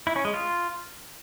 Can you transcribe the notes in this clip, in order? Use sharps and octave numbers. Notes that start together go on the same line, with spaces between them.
E4
C#4
G#3
F4